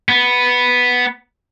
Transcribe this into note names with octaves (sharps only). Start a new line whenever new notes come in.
B3